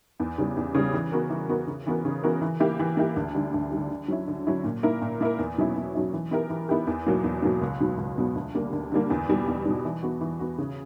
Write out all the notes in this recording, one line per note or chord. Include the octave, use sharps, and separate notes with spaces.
E2
C#3 G3
E2
C#3 G3
E3
B3 F#4 A#4
E3
B3 F#4 A#4
C#3
E3 B3 F#4 A#4
C#3
E3 B3 F#4 A#4
E3
A#3 E4 G4
E3
A#3 E4 G4
D2
D3 G3
D2
D3 G3
D3
F#3 C#4 E4
D3
F#3 C#4 E4
A#2
A#3 E4 A#4
A#2
A#3 E4 A#4
E2
B2 F#3 C#4 E4
E2
B2 F#3 C#4 E4
E3
B3 E4 G4 A#4
E3
B3 E4 G4 A#4
E2
B2 F#3 A#3
E2
B2 F#3 A#3
C#2
B2 F#3 B3
C#2
B2 F#3 B3
D2
D3 G3 A#3
D2
D3 G3 A#3
E2
B2 G3
E2
B2 G3
E3
B3 F#4
E3
B3 F#4
C#3